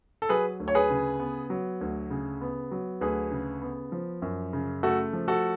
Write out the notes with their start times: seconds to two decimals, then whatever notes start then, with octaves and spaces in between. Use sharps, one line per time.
0.22 A4
0.29 F#3 G#4 B4
0.60 D2
0.68 C#5
0.75 G#4 B4
0.90 C#3
1.20 B3
1.50 F#3
1.81 D2
2.10 C#3
2.41 B3
2.71 F#3
3.01 D2 G#4 B4
3.31 C#3
3.62 B3
3.92 F3
4.22 F#2
4.53 C#3
4.83 A3 F#4 A4
5.13 F3
5.28 F#4 A4